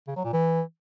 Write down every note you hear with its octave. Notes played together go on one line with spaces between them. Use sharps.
C#3
F#3
A#2
E3